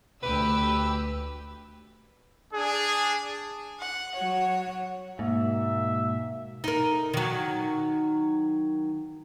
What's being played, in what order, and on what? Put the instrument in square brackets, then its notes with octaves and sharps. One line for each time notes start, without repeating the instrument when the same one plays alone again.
[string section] D2 G4 E6 [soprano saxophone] B4
[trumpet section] D4 G#4
[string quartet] F#5
[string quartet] F#3 C#5 [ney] F#5
[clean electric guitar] G#2 [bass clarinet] B2 [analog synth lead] A#3 [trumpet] E5
[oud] D#4 A#4
D#3 F#3